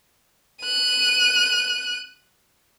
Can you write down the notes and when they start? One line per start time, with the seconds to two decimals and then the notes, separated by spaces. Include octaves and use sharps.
0.61 F#6 D#7